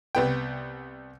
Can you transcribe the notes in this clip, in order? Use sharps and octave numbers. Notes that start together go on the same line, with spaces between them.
C2 B3 G5